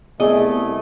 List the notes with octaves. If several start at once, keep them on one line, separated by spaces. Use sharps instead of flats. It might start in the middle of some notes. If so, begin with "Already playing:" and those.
C2 A3 B3 G#4 D5 D#5